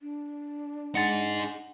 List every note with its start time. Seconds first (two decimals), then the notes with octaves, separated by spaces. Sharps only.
0.01 D4
0.95 D#4 G#4 F#5 A6